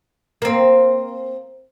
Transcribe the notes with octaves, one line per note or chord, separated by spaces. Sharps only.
A#3 C4